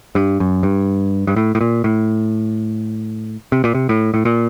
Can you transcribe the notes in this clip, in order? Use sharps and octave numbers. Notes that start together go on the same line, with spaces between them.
G2
F#2
G2
G2
A2
A2
A#2
A2
C3
A#2
C3
A2
A2
A#2